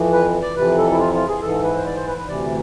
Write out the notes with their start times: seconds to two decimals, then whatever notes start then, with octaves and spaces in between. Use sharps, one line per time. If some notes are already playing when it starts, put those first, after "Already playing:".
Already playing: F2 E3
0.13 B4
0.42 D5
0.55 F2 C3 E3 B4
0.78 A4
0.91 E4
0.99 F4
1.14 F4
1.28 G#4
1.42 G#2 E3 A4
1.64 B4
1.77 C5
1.86 D5
1.96 C5
2.07 B4
2.18 B4
2.28 D2 C3 E3 D5